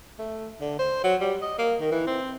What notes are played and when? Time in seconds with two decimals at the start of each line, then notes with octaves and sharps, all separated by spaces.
0.19 A3
0.61 D3
0.79 C5
1.04 F#3
1.21 G3
1.42 D#5
1.58 A#3
1.80 D#3
1.91 E3
2.07 C4